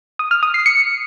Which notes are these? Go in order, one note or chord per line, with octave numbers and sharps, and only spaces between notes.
D#6
F6
D#6
C7
C#7